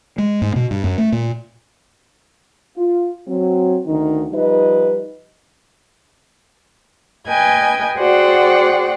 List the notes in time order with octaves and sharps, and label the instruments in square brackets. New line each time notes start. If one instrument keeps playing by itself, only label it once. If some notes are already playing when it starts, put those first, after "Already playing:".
[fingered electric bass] G#3
G#2
B2
G2
F#2
A3
A#2
[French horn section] F4
F#3 C4
D2 D#3 D#4
F3 G3 D#4 B4 D#5
[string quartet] B4 D#5 G5 G#5 G#6
F#4 G#4 C5 D5 F#5 G5